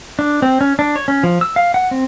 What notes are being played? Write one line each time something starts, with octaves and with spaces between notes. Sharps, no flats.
D4
C4
C#4
D4
C#5
C#4
F3
E6
F5
F#5
C4